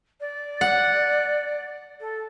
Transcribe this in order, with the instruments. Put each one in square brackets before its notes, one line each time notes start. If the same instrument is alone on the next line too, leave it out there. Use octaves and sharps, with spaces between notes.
[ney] D5
[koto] F#5
[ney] A4